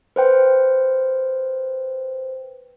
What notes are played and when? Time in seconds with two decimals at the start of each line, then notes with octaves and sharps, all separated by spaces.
0.16 B4 C5 G5